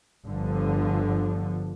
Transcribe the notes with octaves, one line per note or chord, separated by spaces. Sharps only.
G1 D3 F3